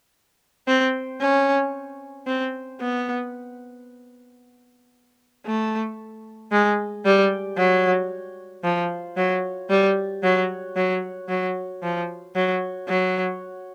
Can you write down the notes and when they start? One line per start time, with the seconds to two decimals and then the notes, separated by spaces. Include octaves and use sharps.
0.67 C4
1.20 C#4
2.27 C4
2.80 B3
5.46 A3
6.52 G#3
7.05 G3
7.57 F#3
8.64 F3
9.16 F#3
9.70 G3
10.23 F#3
10.76 F#3
11.29 F#3
11.83 F3
12.35 F#3
12.88 F#3